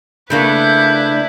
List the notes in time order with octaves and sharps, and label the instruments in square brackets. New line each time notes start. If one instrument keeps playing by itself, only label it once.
[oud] C#3 A3 A#3 [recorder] D4 [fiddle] E4 B4 [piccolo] G6